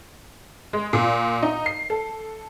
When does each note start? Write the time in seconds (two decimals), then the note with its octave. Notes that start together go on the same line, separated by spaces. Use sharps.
0.73 G#3
0.93 A#2
1.42 D#4
1.66 C7
1.90 A4